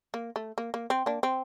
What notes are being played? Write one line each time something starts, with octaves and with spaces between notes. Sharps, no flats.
A#3
A3
A#3
A#3
C4
A#3 D4
C4